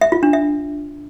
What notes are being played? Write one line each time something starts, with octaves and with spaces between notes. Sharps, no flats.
E5
F4
D4
E5